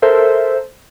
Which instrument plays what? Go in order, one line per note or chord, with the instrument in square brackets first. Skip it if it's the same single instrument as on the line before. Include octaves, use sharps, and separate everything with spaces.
[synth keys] A4 A#4 C5 E5